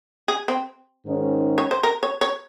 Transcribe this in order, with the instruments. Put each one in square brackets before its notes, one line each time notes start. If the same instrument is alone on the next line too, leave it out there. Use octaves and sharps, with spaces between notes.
[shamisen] G#4
C4
[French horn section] G#2 D#3 G#3 C#4
[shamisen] C#5
C5
A#4
C#5
C#5